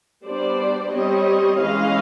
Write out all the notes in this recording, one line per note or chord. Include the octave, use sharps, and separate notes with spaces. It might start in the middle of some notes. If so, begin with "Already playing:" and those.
G3 B3 D4 C5 D5
G3 C4 C#5 D#5
E3 G#3 C#4 D#5 F5